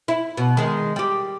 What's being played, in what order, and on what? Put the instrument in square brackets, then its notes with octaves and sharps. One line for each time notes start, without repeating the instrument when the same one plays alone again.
[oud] E4
B2
D#3 G#3
G3 G4